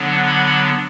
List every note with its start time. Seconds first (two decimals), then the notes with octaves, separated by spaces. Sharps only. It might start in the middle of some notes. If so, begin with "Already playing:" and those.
Already playing: D3 F#3 B3 D4
0.26 B5